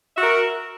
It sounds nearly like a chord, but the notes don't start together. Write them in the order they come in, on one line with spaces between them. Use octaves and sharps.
E5 F#4 A#4